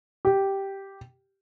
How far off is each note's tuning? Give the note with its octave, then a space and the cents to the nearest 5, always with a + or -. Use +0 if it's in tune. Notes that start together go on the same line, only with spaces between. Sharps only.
G4 -5